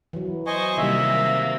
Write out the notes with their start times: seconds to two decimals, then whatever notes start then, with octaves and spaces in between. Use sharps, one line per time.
0.13 E3 F#3
0.47 C5 D#5 G#5 C#6
0.78 C3 D#3 G3 A#3 E5